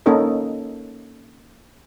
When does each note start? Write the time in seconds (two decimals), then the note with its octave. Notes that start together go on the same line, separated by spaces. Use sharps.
0.06 A#3 C#4 D#4 A4 A#4 D#5